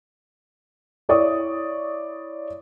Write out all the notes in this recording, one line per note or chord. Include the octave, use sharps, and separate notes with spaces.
E4 C#5 D5 C#6 D#6